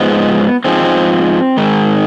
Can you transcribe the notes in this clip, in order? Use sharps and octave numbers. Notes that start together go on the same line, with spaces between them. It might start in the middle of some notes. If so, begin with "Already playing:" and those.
Already playing: G#2 F3 G#3 B3
G#2 F3 G#3 C4
G#2 D#3 G#3